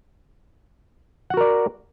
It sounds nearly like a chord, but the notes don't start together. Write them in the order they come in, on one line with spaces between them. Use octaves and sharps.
F#5 F#4 A#4 D5